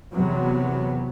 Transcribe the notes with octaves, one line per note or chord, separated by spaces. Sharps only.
E2 C3 F#3 B3